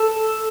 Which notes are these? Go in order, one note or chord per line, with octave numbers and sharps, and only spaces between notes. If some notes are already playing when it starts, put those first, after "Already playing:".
Already playing: A4